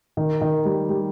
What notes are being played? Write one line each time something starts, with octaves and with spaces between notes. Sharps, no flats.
D#3
D#3
G3
G3